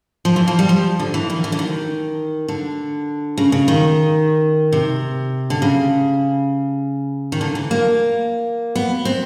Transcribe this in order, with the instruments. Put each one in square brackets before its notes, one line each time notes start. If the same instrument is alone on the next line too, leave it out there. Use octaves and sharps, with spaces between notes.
[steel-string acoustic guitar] F3
E3
F3
G3
F3
D3
E3
D#3
E3
D3
D#3
D3
C#3
C#3
D#3
C3
D3
C#3
D#3
D3
E3
A#3
B3
C4